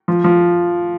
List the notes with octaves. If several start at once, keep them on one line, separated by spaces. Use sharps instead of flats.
F3
F3